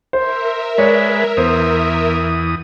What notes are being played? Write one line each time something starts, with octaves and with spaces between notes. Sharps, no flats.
A#4 C5 E5
G#3 B4 C#5 D5
E2 B3 C5 D#6